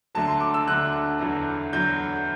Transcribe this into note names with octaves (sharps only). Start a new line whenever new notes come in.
D2 D3 F#3 A5
C6
D6
E6
D2 D3 F#3 F#6
E2 D3 F#3
E2 D3 F#3 G6